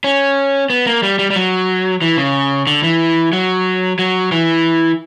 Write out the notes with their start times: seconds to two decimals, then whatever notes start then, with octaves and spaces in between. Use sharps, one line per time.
0.04 C#4
0.70 B3
0.87 A#3
1.03 G3
1.19 G3
1.30 G3
1.36 F#3
2.02 E3
2.18 C#3
2.67 D3
2.83 E3
3.33 F#3
3.99 F#3
4.32 E3